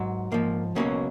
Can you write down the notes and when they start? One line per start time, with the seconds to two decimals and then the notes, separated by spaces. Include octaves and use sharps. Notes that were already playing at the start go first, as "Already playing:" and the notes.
Already playing: G#2 F#3
0.32 G#2 F3 A#3
0.75 C#2 B2 F#3 A#3 C#4